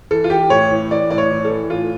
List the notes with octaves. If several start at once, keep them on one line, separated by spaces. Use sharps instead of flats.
E3 A4
F4
E3 G4
A2 C#5
E3
E3 D5
A2 D5
C#5
E3
A4
E3
A2 F4